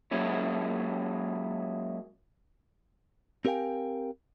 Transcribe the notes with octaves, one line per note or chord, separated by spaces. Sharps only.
F#3 G#3 A#3 C#4 E4
C4 G4 A#4 F5 G5 G#5